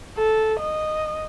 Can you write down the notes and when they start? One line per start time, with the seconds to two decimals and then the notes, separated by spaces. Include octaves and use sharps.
0.17 A4
0.60 D#5